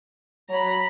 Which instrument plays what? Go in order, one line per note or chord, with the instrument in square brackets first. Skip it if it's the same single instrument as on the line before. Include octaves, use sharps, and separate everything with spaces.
[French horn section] F#3 C#5 [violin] A#5 B5